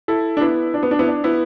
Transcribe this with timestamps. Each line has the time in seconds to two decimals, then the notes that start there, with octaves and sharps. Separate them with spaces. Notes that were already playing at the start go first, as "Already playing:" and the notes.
0.08 E4 A4
0.37 D4
0.41 B3 E4
0.74 D4
0.83 B3
0.91 D4
0.99 B3 E4
1.08 D4
1.24 B3 E4